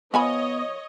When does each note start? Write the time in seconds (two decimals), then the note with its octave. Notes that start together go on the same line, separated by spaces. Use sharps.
0.14 F3 B3 C#5 D#5 G#5 B5